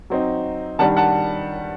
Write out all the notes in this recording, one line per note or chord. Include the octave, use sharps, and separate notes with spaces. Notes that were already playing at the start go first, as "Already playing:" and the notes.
F#3 C4 D#4
D#3 G3 D4 F#5 A5
F#5 A5